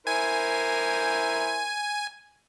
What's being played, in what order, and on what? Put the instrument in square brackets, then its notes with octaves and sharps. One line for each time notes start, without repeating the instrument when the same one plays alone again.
[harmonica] E4 A#4 C5 [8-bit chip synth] G#5